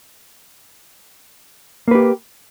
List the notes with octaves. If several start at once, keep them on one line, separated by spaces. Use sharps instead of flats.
A#3 G4 B4